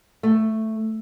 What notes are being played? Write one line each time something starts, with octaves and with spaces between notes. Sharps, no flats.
A3